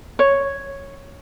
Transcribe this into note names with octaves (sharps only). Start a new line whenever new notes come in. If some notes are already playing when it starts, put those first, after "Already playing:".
C#5